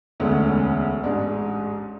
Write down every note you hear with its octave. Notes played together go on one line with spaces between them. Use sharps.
E1 D2 D3 G#3 C#4
A1 G#2 G#3 D4